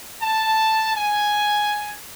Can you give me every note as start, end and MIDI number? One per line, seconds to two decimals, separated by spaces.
0.21 0.94 81
0.94 1.93 80